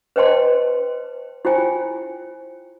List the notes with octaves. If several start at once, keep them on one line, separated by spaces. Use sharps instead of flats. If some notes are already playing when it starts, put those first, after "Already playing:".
B4 C5 D#5 G5 A5 C6
E4 F4 C5 G5 G#5